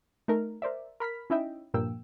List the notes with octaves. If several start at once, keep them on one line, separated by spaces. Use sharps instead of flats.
A3 D#4 A#4
A#4 C5 D5 E5
A#4 B5 F6 B6
C#4 D#4 E4 D#5 E5 G5
G2 A#2 F3 A#3 G5 E6